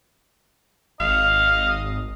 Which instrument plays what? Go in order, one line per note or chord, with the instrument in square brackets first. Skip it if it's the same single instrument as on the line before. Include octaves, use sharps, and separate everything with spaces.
[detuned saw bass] G#1 [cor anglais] D#5 [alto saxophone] F5